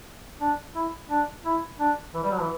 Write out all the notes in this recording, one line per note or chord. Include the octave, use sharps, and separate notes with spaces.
D4
E4
D4
E4
D4
E3
G3
F#3
E3